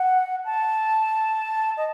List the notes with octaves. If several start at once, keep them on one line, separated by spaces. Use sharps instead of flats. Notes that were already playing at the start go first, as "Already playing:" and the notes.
Already playing: F#5
A5
D#5